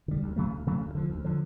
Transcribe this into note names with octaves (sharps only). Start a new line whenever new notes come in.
D3 G3
D2
C#3 F#3 A3
D2
C#3 F#3 A3
D2
D3 F3
D2
D3 F3